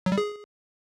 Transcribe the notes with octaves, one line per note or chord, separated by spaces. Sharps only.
F#3
G3
G#4